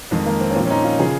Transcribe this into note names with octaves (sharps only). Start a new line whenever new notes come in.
F2 D#3 G#3
A#3
C4
C#4
A#2 F3 C4
C#4
D#4
F4
C#3 F3 G#4